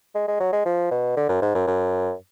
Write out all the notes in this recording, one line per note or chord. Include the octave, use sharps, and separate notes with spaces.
G#3
G#3
F#3
G#3
F3
B2
D3
F#2
G#2
F#2
F#2